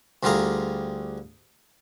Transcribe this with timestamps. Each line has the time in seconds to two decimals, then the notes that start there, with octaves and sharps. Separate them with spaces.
0.23 D2 D3 G3 F4 G#4 A#5